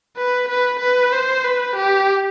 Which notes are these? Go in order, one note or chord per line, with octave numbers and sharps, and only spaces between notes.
B4
B4
B4
C5
B4
G4